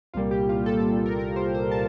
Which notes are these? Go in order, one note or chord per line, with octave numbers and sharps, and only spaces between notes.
C2 A#2 G3 A#3 F4
G4
F4
A4
A4
A#4
A#4
C5
C5
A5